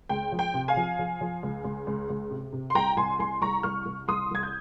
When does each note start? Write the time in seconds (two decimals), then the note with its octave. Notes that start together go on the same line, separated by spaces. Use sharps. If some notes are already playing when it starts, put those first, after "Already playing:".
0.09 C#2 G5
0.32 F3
0.39 G5
0.54 C3
0.68 F5 G#5
0.76 F3
0.99 F3
1.21 F3
1.43 C#2
1.64 C#2
1.87 C#2
2.10 C#2
2.31 C3
2.53 C3
2.70 C6
2.75 C2 G5 A#5
2.97 C2 G#5 C6
3.19 C2 G#5 C6
3.41 C2 A#5 C#6
3.63 C2 C#6 F6
3.85 C2
4.08 C2 C6 D#6
4.31 C2 G#6
4.43 G6